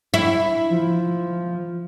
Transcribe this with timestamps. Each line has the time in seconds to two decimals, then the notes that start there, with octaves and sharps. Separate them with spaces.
0.14 E4
0.70 F3